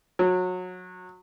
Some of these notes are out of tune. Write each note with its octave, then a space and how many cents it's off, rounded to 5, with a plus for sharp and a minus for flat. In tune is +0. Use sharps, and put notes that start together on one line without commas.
F#3 -25